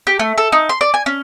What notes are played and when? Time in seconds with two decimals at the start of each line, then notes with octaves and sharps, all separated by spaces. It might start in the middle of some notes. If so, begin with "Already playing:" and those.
0.07 G4
0.19 A3
0.38 A4
0.52 D#4
0.69 C6
0.81 D5
0.94 G#5
1.06 C#4